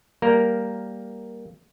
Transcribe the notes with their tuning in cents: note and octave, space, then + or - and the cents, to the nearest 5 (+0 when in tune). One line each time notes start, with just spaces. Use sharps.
G3 +0 A#3 +0 A#4 +0